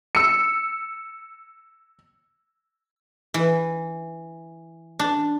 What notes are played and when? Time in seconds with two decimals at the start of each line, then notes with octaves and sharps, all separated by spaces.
0.15 E6 C#7
3.34 E3
4.99 D4